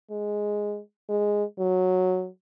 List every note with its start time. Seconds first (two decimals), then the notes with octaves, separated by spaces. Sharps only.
0.10 G#3
1.09 G#3
1.59 F#3